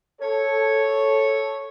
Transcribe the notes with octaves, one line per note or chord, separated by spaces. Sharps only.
A4 C#5